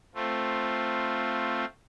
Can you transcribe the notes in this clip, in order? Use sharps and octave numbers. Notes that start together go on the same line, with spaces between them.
A3 C4 F4